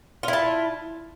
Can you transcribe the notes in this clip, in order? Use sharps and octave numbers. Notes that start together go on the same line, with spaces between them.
E4 F4 A5